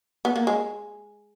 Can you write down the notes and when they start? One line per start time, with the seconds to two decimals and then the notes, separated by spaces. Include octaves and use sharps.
0.25 B3
0.36 A#3
0.47 G#3